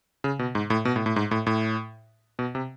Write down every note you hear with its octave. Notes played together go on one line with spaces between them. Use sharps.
C#3
B2
G#2
A2
B2
A2
A2
G#2
A2
A2
B2
C3